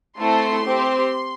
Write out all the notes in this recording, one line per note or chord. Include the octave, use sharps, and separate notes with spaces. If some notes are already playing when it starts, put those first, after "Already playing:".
A3 C4 E4 A4 C6
C4 G4